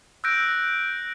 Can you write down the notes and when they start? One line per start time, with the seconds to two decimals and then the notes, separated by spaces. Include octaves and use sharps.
0.24 E6 F#6 G6 A#6 D7